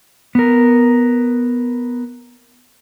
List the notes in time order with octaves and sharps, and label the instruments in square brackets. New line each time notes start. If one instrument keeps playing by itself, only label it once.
[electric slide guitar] B3 A#4